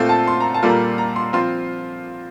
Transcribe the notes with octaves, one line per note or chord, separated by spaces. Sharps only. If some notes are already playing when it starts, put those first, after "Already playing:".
Already playing: A#2 A3 C4 F4 A4
A5
C6
A#5
A5
A#2 G3 A#3 F4 A4
A#5
A#5
C6
F3 C4 F4 C6